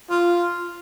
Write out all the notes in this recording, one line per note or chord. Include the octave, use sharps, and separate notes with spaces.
F4